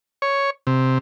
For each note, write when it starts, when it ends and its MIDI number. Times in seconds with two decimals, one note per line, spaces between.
0.22 0.50 73
0.67 0.98 48